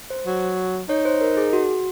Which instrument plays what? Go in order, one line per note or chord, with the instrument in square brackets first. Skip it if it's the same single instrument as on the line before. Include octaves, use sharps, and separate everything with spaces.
[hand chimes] C5
[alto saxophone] F#3
[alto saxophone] D#4 [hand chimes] C#5
[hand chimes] C5
A#4
G#4
F#4